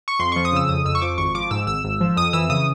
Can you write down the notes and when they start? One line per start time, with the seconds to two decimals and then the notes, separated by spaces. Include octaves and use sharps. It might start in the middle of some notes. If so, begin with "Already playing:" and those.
0.08 C#6
0.19 F2 C6
0.32 F3 C#6
0.45 D#6
0.52 C#3 E6
0.69 F2 D#6
0.85 F2 E6
0.95 C#6
1.02 F3 D6
1.18 G#1 C#6
1.35 F3 D6
1.51 G#2 E6
1.67 G#1 E6
1.84 G#1
2.01 F3
2.17 F2 D#6
2.33 E3 E6
2.49 C#3 D#6